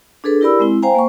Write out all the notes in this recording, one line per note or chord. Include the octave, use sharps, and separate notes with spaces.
D4 G#4 A4 B4
E4 G4 A#4 D5 B5 E6
G#3 C4 E4
C5 F5 G5 G#5 A#5
A#3 C5 C#6